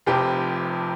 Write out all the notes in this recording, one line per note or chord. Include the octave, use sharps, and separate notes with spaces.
F1 F2 C3 G4